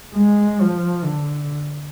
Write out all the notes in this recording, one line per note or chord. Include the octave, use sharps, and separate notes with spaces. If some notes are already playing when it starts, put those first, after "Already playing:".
G#3
F3
D3